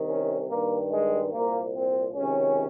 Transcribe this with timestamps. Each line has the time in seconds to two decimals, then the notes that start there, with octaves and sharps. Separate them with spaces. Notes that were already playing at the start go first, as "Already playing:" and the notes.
Already playing: C2 C3 D#3
0.09 C#4
0.49 G2 D#3 A#3
0.91 G#3
1.31 C2 A#2 A#3
1.74 C4
2.14 C#2 C3 D#3 C#4